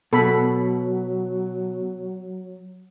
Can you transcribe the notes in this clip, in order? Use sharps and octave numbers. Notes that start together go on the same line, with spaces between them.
B2 F#3 A4 B5